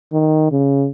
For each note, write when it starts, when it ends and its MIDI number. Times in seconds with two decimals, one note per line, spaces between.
0.12 0.49 51
0.52 0.89 49